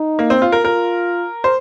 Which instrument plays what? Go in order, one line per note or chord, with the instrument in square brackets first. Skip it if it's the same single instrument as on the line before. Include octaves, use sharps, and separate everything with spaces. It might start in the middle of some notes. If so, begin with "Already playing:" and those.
Already playing: [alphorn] D#4
[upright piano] A#3
C4
F4
A#4
[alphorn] F4 [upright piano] A#4
[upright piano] C5